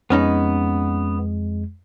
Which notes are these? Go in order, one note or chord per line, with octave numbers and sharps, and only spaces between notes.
F2 G#3 B3 C#4 D#4